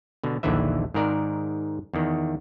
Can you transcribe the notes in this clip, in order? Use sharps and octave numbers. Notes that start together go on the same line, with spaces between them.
B2 D3
A#1 D#2 D3 E3 B4 E5
G#2 D#3 A#4 D5
E2 D#3